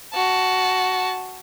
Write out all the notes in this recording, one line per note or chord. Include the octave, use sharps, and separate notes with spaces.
F#4 A5